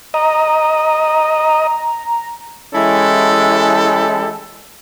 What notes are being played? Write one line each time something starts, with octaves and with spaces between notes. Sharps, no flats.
D#5 A#5
E3 G#3 C#4 E4 G4 A4